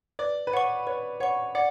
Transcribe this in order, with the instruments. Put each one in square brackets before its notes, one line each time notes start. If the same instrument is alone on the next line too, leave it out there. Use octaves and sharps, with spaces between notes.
[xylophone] B4 [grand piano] D5
[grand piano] B4
[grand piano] C#5 [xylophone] F#5 C#6
[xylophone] B4 [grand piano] C#5
[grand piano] C#5 [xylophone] F#5 C#6
[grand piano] D5 [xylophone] F#5